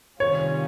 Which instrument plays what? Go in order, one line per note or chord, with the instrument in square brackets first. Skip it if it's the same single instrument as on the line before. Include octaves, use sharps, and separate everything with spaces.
[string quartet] C3 D#3 G3 C#4 F4 [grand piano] C#5